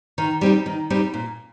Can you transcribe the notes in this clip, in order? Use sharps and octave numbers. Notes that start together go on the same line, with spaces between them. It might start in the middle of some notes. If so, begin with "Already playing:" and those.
D#3
G3 C4 D#4
D#3
G3 C4 D#4
A#2